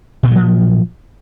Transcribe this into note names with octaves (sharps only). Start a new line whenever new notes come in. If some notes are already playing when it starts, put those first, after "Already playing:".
G2 A#2 F3 F#3